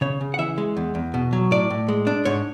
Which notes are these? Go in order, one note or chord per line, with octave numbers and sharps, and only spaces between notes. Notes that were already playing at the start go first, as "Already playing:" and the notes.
C#3 C#5
C#3
F#5
E3 E5
G#3
E2
E2
B2
F#3
A2 D5
A2
G#3
D4
G#2 C#5